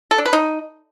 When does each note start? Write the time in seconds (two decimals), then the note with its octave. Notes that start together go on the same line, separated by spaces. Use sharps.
0.11 A4
0.18 D4
0.26 B4
0.33 D#4